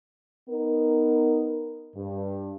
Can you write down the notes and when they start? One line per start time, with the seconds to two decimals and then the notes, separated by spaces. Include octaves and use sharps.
0.48 B3 D#4 A#4
1.95 G2